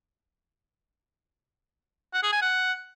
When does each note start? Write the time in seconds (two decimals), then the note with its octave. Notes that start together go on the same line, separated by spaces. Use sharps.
2.14 F#5
2.23 G#4
2.32 G#5
2.42 F#5